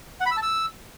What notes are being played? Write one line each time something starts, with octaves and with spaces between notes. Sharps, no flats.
F#5
B5
E6
A5
E6